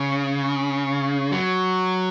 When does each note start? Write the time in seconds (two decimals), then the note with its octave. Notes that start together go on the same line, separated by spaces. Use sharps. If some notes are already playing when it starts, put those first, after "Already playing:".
Already playing: C#3
1.32 F#3